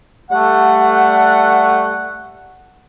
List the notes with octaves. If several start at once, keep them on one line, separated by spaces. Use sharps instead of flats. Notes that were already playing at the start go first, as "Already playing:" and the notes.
G3 A3 F#5